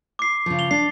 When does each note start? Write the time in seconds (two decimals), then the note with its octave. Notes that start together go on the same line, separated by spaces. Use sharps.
0.19 D6 C7
0.46 C#3 F3
0.59 F7 G7
0.71 D4 A6 C7